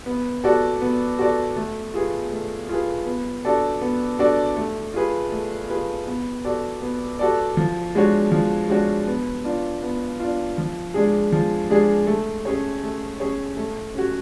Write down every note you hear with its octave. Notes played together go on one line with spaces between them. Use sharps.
B3
F#4 A4 D5
B3
F#4 A4 D5
A3
F4 G#4 B4
A3
F4 G#4 B4
B3
D4 F#4 A4 D5
B3
D4 F#4 A4 D5
A3
F4 G#4 B4
A3
F4 G#4 B4
B3
F#4 A4 D5
B3
F#4 A4 D5
F3
G#3 D4 F#4 C#5
F3
G#3 D4 F#4 C#5
B3
D4 F4
B3
D4 F4
F3
G#3 D4 G#4
F3
G#3 D4 G#4
A3
C#4 G#4 C#5
A3
C#4 G#4 C#5
A3
C#4 F#4